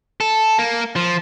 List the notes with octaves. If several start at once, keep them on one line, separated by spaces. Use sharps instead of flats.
A4
A#3
F3